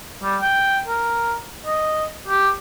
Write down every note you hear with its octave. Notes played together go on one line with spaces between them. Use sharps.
G3
G5
A#4
D#5
G4